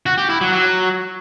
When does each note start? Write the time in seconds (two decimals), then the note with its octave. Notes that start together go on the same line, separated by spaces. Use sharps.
0.06 F#4
0.18 G4
0.29 E4
0.41 F#3
0.53 F#3